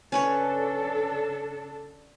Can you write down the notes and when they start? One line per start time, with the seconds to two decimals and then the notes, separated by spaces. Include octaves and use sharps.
0.12 C#3 C#4 D4 A4 B4 C#5